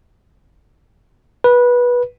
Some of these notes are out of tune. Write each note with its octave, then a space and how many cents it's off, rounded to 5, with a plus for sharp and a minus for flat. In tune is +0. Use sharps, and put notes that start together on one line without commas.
B4 -20